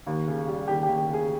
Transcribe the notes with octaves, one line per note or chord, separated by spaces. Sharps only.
D#2
C#3
G3
D#2 G4
G4
D#2
G4
C#3
G#4